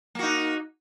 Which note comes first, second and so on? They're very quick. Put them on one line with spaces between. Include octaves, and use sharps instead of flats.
A#3 F#4 D#4